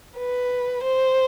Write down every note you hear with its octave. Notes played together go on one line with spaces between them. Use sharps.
B4
C5